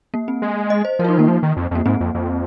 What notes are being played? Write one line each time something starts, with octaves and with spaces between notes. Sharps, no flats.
A#3
C4
G#3
D#5
C5
F3 A#4
F4
D#4
D#3 A#3
F3 A#3
D#3
F2
F2 A#3
G#2 C4
F2
F2